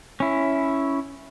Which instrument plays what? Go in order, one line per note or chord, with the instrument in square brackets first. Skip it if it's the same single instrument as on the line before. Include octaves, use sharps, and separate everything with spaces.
[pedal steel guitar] C#4 E4